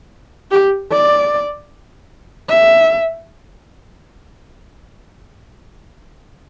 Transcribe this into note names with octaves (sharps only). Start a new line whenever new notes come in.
G4
D5
E5